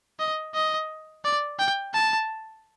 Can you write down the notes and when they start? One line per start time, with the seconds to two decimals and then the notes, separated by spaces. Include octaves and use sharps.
0.20 D#5
0.55 D#5
1.24 D5
1.59 G5
1.94 A5